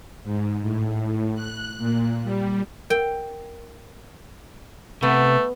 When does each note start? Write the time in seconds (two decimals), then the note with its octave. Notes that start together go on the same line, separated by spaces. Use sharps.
0.24 G#2
0.62 A2
1.35 F#6
1.78 A#2
2.24 G3
2.90 A#4 F#5 G5
5.03 C3 A3 B3